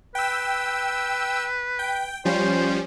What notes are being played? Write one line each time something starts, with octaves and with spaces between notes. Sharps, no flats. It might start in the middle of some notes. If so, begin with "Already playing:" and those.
B4 G5 E6
G5
F3 G3 C#4 C5